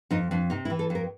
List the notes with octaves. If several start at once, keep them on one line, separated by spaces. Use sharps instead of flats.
F2 D#4
F2 D4
C3 D#4
E4
E3
A4
F2 A#4